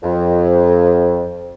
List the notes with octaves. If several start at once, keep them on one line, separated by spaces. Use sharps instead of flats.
F2